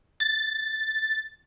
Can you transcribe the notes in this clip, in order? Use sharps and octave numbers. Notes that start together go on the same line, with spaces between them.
A6